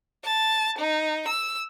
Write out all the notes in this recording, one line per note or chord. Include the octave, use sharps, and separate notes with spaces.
A5
D#4
E6